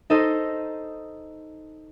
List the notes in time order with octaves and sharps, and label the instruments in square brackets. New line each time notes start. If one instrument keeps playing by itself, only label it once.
[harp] D#4 A4 C5 D#5